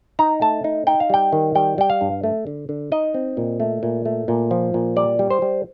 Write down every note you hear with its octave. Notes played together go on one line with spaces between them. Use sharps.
D#4 A#5
A3 A5
D#4
D#4 G5
F5
G3 G5
D#3
G3 G5
G3 G5
F5
G2
A3
D3
D3
D#4 D#5
C4
A#2
A3
A#2
A3
A#2
F3
A#2
G3 D5
G3
C5
G3